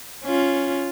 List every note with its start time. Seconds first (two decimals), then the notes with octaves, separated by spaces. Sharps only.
0.24 C#4 F4